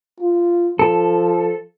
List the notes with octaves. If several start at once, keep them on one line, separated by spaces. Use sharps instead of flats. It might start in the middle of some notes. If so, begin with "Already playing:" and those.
F4
F3 A4